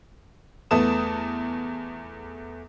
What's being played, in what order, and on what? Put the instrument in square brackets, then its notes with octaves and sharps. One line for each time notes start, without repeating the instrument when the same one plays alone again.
[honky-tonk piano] E2 A3 B3 A5 D#6 E7